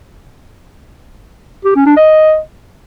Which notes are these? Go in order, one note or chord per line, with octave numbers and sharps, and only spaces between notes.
G4
C#4
D4
D#5